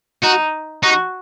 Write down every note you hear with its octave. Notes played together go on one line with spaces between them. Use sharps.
D#4 F#4
D#4 F#4